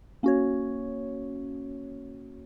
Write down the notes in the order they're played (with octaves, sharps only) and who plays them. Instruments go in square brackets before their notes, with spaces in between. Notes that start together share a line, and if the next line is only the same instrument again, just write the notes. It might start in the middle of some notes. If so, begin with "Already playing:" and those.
[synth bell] A#3 C#4 F#4 C#5